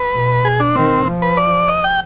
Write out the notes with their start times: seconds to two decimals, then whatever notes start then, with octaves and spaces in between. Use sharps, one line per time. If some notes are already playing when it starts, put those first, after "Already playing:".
Already playing: B4
0.14 B2
0.45 G#4
0.60 D4
0.76 D#3 C4
1.06 F3
1.22 B4
1.37 D5
1.68 D#5
1.84 G5